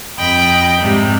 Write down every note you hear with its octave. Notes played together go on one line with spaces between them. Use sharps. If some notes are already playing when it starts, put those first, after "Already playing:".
F2 D#5 G5 B5
G#2 C3 G3